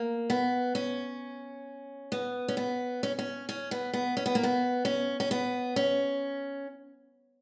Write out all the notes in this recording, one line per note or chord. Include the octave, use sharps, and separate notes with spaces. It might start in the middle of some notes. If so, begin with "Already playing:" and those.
Already playing: A#3
B3
C#4
B3
C#4
B3
C#4
C#4
C#4
B3
B3
C#4
B3
A#3
B3
C#4
C#4
B3
C#4